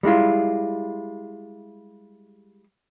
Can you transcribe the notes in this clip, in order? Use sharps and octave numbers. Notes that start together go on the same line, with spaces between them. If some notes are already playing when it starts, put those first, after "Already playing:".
G3 G#3 E4 F4